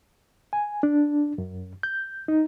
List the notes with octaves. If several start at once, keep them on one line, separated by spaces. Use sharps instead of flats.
G#5
D4
F#2
G6
D#4